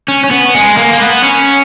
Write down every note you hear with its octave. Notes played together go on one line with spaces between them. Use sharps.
C#4
C#4
B3
G#3
A#3
A#3
B3
C#4